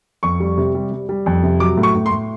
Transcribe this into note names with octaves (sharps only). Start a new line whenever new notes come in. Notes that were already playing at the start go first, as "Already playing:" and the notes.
F2 C#6
G3
C3
G3
G3
G3
F2
C3
F#3 D6
A2
C#6
A2
C6
A2